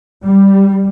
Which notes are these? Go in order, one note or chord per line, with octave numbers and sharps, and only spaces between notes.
G3